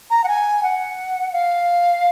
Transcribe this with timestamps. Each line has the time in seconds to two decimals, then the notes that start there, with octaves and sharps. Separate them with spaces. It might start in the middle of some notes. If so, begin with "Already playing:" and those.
0.10 A#5
0.24 F#5
0.28 G#5
0.63 F#5
1.32 F5